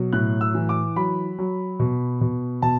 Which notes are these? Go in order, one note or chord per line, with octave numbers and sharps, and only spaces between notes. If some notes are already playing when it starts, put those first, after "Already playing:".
Already playing: B2 F#3
A2 F#6
E6
E3
D6
F#3 B5
F#3
B2
B2
B2 A5